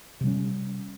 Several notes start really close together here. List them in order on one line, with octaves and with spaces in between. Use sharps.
C3 G3 C#4